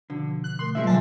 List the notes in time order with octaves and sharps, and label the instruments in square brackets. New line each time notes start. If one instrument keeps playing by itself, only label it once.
[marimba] B2 F3 F#4 [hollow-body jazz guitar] D3
[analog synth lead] F#6
[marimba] B2 A3 A#4 [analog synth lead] C6
[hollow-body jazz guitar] D#2 F3 G#3 [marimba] F#3 [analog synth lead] E5
[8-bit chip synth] B2 F#3 [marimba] C4 F#5 G#5 [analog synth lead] A5